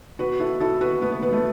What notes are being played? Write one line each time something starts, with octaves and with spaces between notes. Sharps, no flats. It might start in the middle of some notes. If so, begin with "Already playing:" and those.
B2 F#4 B4
B2 E4 A4
B2 E4 A4
B2 F#4 B4
A3 B3
B3
B2 B3
A3